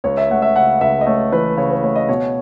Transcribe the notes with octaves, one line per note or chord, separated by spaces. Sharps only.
C#2 C#5
E5
A3 F#5
E5
C#3 F#5
C#2 E5
D#5
A3 C#5
E3 B4
C#3 C#5
B4
A3 C#5
D#5
B2 C#5